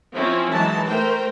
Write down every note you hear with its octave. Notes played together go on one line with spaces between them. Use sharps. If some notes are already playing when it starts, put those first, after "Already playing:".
F3 C4 C#4 E4
E3 F#3 G#3 D#4 A5
A3 A#4 C5 G5